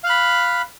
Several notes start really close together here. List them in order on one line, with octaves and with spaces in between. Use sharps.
F5 F#6 B5